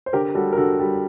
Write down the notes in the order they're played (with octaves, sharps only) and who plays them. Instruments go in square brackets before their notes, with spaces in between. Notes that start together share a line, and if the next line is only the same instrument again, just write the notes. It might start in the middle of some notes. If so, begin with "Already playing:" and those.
[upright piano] C5
D3 G4 A#4
G3 F#4 A4
A#4
D3 F#4 A4
G3